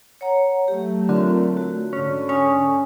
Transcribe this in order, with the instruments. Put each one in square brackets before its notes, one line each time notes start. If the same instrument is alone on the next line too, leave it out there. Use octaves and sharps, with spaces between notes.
[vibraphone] C#5 F#5 A#5
[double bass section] F#3 A3 [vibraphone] G4
[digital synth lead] D3 [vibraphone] C4 F4 A#4
[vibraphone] F#4
[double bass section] G#2 D3 [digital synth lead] C#4
[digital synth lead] C#4 [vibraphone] G#5 C#6 D#6